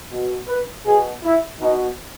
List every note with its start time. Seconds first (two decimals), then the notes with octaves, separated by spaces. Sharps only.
0.11 B2
0.48 B4
0.86 B2 G#4
1.24 E4
1.61 B2 D#4